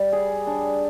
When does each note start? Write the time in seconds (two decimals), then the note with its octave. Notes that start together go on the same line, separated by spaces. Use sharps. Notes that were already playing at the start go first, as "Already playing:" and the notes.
Already playing: G3
0.12 G#4
0.47 D4